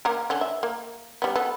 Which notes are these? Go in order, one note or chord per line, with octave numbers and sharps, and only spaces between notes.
A#3 A#4
D3 C#4
E5
A#3
G3 B3
B3 A4